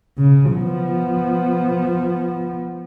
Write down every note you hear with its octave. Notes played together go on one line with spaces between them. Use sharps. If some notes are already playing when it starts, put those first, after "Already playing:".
C#3
F3 B3